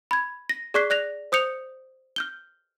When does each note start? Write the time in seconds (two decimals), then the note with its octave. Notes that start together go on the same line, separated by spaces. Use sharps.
0.11 B5 G#6
0.49 A#6
0.74 G#4 D5 C#6 F#6 B6 C7
0.90 D5 F#6 A#6 F7
1.32 C5 D#6 G6 C#7 F7
2.16 F6 G6 G7